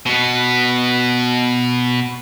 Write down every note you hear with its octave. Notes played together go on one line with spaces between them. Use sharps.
B2 B3